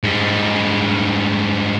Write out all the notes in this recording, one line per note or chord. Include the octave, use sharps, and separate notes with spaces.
G#2 G3